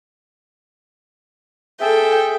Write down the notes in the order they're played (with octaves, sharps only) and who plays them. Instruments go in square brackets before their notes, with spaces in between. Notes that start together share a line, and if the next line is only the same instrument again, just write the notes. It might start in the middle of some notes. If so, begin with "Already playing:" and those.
[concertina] G#4 E5 [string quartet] A4 G5